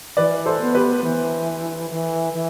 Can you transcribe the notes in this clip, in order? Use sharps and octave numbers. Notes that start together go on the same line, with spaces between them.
E3 B4 D5
A4 C5
B3
G4 B4
E3
E3
E3